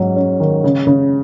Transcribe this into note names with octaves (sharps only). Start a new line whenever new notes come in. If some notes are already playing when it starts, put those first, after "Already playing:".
Already playing: G#2 F#3 C#4
C#4
D#3
C#3
C#3